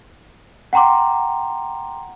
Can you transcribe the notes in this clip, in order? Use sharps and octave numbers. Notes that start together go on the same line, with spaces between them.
F#5 G5 A#5 C6 D6